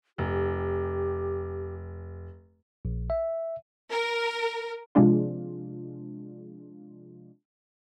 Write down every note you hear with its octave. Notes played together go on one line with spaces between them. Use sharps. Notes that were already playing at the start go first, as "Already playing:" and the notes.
F1 G4
A#1
E5
A#4
C3 F3 G#3 D4 F4